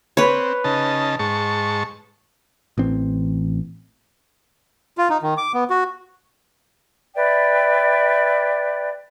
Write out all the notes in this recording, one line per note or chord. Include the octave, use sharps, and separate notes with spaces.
C4 B4 C#5
C#3 D#4 A5
G#2 A5 C#6
A1 E3 C4
F4
D#4
D#3
D6
B3
F#4
B4 D5 E5 G5